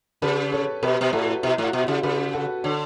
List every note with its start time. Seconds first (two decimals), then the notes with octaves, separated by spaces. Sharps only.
0.22 C#3 G4 B4
0.53 A4 C#5
0.83 B2 G4 B4
1.01 B2
1.13 A2 F#4 A4
1.43 B2 E4 G4
1.58 A2 F#4
1.73 B2
1.83 E4 G4
1.88 C#3
2.03 C#3 G4 B4
2.33 F#4 A4
2.64 D3 A4 C#5